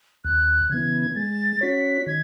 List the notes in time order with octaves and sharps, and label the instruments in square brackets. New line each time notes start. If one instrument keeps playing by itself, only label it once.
[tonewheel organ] D#2 [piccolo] F#6
[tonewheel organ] C#3 E3 B3 [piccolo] G#6
[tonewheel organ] G#3 [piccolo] A6
[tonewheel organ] C#4 F#4 C#5 [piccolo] B6
[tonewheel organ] D#3 [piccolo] G#6